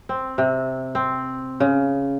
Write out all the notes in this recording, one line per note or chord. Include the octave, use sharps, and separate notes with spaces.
C4
C3
C4
C#3